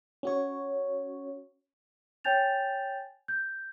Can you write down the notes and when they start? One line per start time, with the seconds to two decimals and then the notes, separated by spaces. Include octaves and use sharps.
0.23 C#4 F#4 C#5
2.24 C#5 G5 G#5 G6 A6 F7
3.28 G6